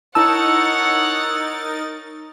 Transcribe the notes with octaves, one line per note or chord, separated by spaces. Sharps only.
D#4 E4 A#4 C#5 F#5 A5 E6 A6